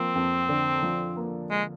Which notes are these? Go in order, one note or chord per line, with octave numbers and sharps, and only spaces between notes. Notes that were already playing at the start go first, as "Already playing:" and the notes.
Already playing: F3 A#3 C4
F2
D3
F3
A#3
G#3